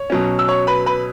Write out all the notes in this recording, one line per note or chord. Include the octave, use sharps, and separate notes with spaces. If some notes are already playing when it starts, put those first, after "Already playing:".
Already playing: C#5
B2 F#3 C#4
E6
C#5 C#6
B4 B5
B4 B5